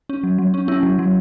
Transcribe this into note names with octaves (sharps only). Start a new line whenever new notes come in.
C#4
F#3
F#3
C#4
C#4 E4
F#3
F#3